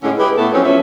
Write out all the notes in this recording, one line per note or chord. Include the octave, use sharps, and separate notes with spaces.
A2 D3 G#3 C#4
E4 G4 G#4 B4
A2 A3 B3 A4
F2 F#3 C4 C#4
E2 F3 C#4 E5